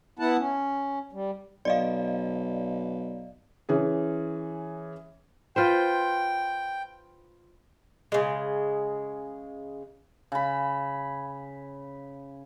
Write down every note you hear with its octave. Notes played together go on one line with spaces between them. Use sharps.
B3 E4 F#5 A5
C#4
G3
B1 D5 D#5 F5
E3 C#4 G#4
F4 B4 C5 G5
C#3 G#3
C#3 B5